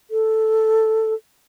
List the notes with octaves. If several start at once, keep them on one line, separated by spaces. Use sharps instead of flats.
A4